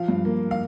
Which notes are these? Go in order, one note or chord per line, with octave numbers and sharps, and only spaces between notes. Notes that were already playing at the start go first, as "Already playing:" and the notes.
Already playing: F3 F5
G2
A#3
F5